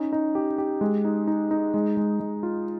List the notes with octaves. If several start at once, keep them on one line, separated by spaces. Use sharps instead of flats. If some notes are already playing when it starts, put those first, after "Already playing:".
Already playing: C#4 D#4
D#4
G4
G4
G#3
D#4
D#4
D#4
G#3
G#3
G#3
F4